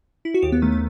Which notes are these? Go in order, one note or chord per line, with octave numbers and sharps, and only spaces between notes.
E4
F#4
D#2 G4
B3
D#3 A3
A3